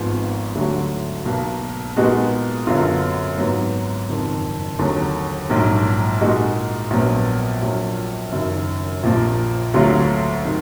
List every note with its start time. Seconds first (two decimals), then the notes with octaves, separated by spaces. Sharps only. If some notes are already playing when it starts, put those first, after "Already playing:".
Already playing: G#1 G#2 F3 G#3 B3
0.55 D2 D3 F#3 D4 F#4
1.25 B1 B2 A#3
1.96 A#2 G#3 B3 D#4 F#4
2.67 F#2 D3 F#3 B3 F4
3.38 G#2 F#3 B3
4.09 F#1 F2 D#3
4.79 D#2 D3 F#3 A#3
5.49 A#1 G#2 F#3 A#3
6.21 A#2 G#3 D#4 F#4
6.90 A#1 A#2 F#3 B3
7.62 A#1 A#2 F#3
8.32 F#1 F#2 D#3
9.03 A#1 A#2 F3 A#3
9.74 D2 D3 F#3 A#3 F4
10.45 D#3